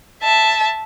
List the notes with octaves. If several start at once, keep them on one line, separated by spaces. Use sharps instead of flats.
E5 A5